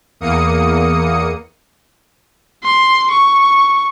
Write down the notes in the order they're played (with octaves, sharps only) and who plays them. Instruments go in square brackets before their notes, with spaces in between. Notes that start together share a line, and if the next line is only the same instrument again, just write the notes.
[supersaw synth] E2 A#3 D#6 C#7
[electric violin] C6
C#6